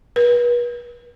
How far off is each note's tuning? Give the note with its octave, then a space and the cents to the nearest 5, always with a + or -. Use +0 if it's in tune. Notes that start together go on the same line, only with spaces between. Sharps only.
B4 -40